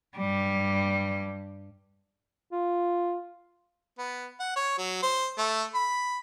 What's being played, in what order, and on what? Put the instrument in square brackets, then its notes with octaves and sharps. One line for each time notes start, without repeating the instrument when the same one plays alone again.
[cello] G2 G3
[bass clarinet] F4
[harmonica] B3
F#5
C#5
F#3
C5
A3
B5